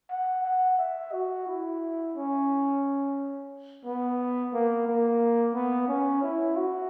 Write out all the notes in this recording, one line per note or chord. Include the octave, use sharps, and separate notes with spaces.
F#5
F#5
E5
F#4
E4
C#4
B3
A#3
A#3
B3
C#4
E4
F#4